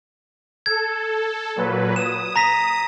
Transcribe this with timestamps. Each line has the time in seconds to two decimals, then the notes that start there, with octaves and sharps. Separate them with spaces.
0.66 A4 G#6
1.56 A#2 F#3 B4
1.96 D#6 E7
2.36 A#5 A#6 B6